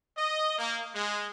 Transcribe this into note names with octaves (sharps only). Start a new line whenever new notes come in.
D#5
A#3
G#3